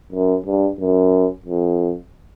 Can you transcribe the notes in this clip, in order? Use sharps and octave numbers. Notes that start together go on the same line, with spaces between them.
F#2
G2
F#2
F2